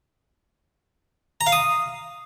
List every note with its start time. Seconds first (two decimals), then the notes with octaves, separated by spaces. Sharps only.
1.41 A#5
1.47 F5
1.52 D#6